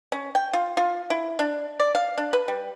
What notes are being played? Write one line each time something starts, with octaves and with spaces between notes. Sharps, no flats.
C#4
G5
F4
F4
E4
D4
D5
F5
D4
B4
G3